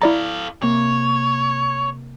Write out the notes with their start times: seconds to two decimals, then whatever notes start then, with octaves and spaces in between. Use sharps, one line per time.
0.02 E4 A4 D5 F5 A#5
0.62 C3 A#3 C#5